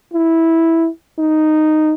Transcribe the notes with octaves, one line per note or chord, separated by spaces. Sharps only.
E4
D#4